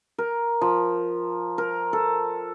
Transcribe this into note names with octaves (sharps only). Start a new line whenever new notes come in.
A#4
F3
A#4
A4